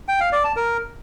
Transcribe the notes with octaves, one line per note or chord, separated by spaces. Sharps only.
G5
F5
D5
A5
A#4